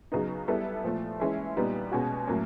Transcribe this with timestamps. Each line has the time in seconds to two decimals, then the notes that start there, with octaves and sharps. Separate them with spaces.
0.12 C#3 F#3 B3 D#4
0.48 G3 B3 E4 A4
0.84 A#2 F3 A3
1.20 E3 G#3 C#4 E4
1.56 A#2 G3 B3 D#4
1.92 B2 G#3 C#4 F#4
2.27 A2 F#3 A#3 C#4